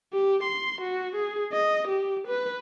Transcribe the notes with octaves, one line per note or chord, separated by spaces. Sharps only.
G4
C6
F#4
G#4
D#5
G4
B4